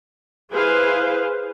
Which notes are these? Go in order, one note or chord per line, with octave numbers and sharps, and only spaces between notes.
E4 G#4 B4 C5 F5